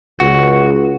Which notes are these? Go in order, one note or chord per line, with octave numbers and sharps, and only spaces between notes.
C#2 F#4